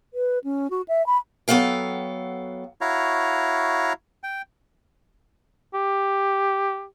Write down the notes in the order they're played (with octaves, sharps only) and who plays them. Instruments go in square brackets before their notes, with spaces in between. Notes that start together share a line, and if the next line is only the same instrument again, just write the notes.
[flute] B4
C#4
F#4
E5
B5
[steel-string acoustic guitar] F#3 B3 A4 F5 G5
[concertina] E4 F#4 C#5 F5 A#5
G5
[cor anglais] G4